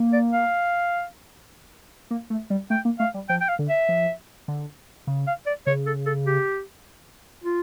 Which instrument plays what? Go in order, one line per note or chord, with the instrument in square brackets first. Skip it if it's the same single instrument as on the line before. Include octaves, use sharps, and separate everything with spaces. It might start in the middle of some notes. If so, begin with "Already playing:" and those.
Already playing: [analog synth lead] A#3
[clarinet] D5
F5
[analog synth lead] A#3
A3
G3
[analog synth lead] A3 [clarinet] G5
[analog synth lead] A#3
[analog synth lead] A3 [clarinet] F5
[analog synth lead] G3
[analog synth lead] F3 [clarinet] G5
[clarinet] G5
F5
[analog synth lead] D3
[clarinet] E5
[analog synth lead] F3
D3
C#3
[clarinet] F5
D5
[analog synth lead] C#3 [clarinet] C#5
[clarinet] A4
A4
G4
F4